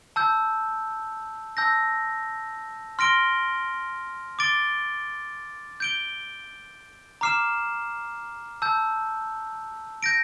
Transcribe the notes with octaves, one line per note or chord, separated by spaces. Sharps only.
A5 E6 G6
A5 E6 G6 A#6
C6 F6 A#6 D7 G7
D6 A6 D7 G7
G6 D7 G7
A#5 D6 F6 C7 E7
A5 E6 G6
G6 A#6 D7